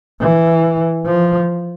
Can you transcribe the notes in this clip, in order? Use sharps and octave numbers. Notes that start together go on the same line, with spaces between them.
E3
F3